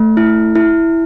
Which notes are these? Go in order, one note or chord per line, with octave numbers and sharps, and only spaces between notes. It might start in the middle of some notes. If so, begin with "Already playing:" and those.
Already playing: A3
E4
E4